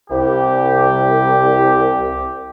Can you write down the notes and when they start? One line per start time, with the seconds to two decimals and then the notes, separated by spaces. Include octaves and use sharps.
0.10 C2 G4